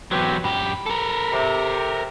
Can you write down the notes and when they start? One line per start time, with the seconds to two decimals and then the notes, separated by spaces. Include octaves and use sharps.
0.11 E2 F#3 C4 G4 B4
0.44 F#2 G4 B5
0.86 A4 A#4
1.32 C3